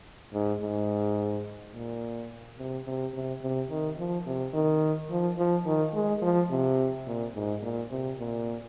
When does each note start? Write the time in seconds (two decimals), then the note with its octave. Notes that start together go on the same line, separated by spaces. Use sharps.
0.33 G#2
0.61 G#2
1.74 A#2
2.58 C3
2.86 C3
3.13 C3
3.41 C3
3.70 D#3
3.98 F3
4.26 C3
4.54 D#3
5.10 F3
5.37 F3
5.66 D#3
5.94 G#3
6.22 F3
6.50 C3
7.06 A#2
7.34 G#2
7.62 A#2
7.90 C3
8.18 A#2